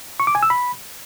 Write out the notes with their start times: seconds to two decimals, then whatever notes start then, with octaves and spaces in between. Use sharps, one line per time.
0.20 C#6
0.27 D6
0.35 G#5
0.43 E6
0.50 B5